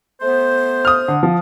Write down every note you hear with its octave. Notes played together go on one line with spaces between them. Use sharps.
A3 B3 C5
D#6 F6
D3
F3